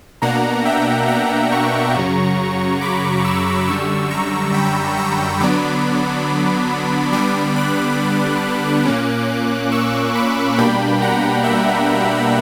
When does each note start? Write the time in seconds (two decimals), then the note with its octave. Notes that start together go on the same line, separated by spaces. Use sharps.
0.22 B2 A#3 D4 F#5 A#5
0.65 E5 G5
1.08 F#5 A#5
1.52 A#5 C#6
1.95 F#2 C#3 F#3
2.81 B5 D6
3.25 C#6 E6
3.67 F#2 D3 G3 C#6 E6
4.11 A#5 C#6
4.54 G5 B5
4.97 A#5 C#6
5.40 D3 F#3 B3 D4 B5 D6
7.12 D3 G3 B3 D4 B5 D6
7.56 D6 F#6
8.85 A#2 A#3 C#4
9.72 C#6 E6
10.15 B5 D6
10.58 B2 G3 A#3 D4 G5 B5
11.02 F#5 A#5
11.44 E5 G5